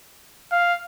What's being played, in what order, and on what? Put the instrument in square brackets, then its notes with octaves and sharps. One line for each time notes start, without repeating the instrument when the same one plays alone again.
[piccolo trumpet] F5